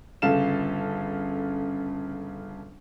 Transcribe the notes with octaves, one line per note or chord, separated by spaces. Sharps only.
G1 C#3 A4 F5 E7